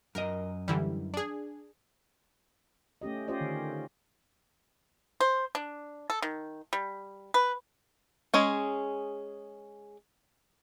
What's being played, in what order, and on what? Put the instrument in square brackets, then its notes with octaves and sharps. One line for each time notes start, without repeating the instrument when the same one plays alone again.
[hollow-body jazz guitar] F#2 D#5 [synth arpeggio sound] A#4
[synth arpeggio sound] D3 E3 G3
D4 G#4
[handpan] A3 C#4 G4 D#5
C#4 F4 G4 C5 D5 D#5
D3 D#3
[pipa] C5
D4
A4
D#3
G3
B4
[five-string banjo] G#3 C#4 G#4